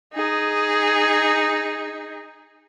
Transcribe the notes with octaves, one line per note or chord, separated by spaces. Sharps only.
D#4 G#4